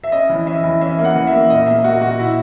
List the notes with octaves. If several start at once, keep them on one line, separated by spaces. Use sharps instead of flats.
E5
C#4 D#5
E3
C#4 E5
E3
C#4 E5
A#3
F#5
E3
E5
A#3
A#2 D#5
A#3 E5
A#3 F#4
A#2 F#4
A#2 E4